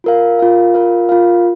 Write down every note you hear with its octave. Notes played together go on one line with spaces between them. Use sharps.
F4 A#4 F5
F4 A#4 F5
F4 A#4 F5
F4 A#4 F5